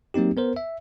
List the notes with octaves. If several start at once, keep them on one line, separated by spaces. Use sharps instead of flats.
F#3 A#3 C4 D#4 G4
B3 A#4 C5
E5